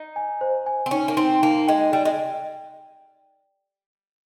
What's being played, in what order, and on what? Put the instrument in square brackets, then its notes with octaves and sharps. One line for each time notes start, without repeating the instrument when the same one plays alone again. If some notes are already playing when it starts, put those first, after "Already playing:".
Already playing: [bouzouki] D#4
[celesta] G#5
C5
G#5
[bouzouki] C4
[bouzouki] C#4 [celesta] D#4
[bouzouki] A#3
[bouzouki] C4 [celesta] D#4
[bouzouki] A#3 [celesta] D#4
[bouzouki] G#3 [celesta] G5
[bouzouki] G3 [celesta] G5
[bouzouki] G#3